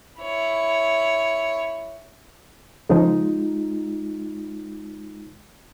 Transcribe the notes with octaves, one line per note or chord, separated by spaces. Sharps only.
E4 C#5
C#3 F3 G#3 D#4 F4